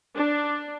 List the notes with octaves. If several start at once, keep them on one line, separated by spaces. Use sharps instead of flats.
D4